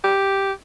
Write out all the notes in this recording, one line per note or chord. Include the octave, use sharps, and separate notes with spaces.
G4